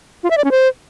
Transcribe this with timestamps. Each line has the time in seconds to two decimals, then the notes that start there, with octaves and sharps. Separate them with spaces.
0.24 F4
0.30 E5
0.37 D5
0.44 C#4
0.51 C5